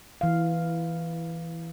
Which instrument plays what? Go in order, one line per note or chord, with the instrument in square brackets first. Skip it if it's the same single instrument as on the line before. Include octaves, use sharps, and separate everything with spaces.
[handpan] E3 F5